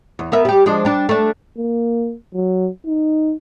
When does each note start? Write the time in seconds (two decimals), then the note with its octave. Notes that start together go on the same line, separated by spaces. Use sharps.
0.19 E2
0.32 B3 A#4 E5
0.45 G3 G4
0.66 F3 G#3 D4
0.85 G3 D4
1.09 A3 D4
1.58 A#3
2.35 F#3
2.87 D#4